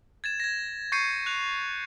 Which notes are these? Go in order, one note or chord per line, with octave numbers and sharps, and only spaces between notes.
G#6 A6 E7
G#6 A#6
C#6 G6 A6 C7 C#7 D#7
F#6 F7